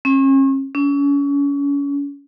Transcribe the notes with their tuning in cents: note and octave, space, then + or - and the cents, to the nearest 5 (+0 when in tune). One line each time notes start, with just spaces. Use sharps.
C#4 -40
C#4 +35